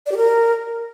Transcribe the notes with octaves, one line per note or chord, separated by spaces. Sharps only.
D5
G4
A#4